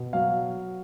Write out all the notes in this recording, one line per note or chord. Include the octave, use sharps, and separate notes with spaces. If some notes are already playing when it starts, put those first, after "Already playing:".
Already playing: B2
F#3 F5